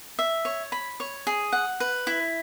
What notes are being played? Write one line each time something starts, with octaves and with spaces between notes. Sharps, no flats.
E5
C#5
B5
C#5
G#4
F#5
B4
E4